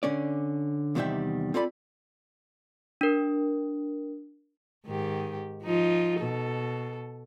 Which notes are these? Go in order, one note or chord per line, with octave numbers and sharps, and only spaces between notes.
D3 C#4 D5
E2 C3 D#3 G3 E5 G5
C4 F4 A4 D5 B5
D4 A#4
G#2 D#3 G4
F3 D#4 F4
B2 A4